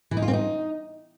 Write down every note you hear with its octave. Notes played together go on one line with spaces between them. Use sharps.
E3
D#4
F4
C4
D#4